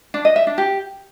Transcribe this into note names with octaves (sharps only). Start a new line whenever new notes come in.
D4
D#5
E5
D4
G4